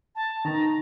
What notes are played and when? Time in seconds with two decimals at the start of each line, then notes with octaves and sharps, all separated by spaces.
0.15 A5
0.45 D#3 A#5